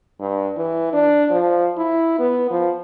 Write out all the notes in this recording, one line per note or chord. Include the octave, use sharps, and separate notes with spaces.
G2
E3
D4
F3
E4
B3
F3